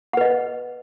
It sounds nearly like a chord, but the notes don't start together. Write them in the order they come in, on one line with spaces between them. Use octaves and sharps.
F#5 B4 D#5